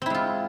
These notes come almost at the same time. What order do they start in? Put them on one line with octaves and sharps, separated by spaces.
C4 E4 G#3 F4